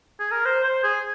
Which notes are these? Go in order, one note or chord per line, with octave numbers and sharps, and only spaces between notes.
G#4
A#4
C5
C5
G#4